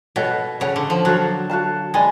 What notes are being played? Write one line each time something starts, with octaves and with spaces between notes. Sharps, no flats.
B2 A4 C#5 F#5
C#3 A4 C#5 F#5
D3
F3
F#3 F#4 A4 F5 A5
F#4 A4 F5 A5
G#3 D5 G#5 B5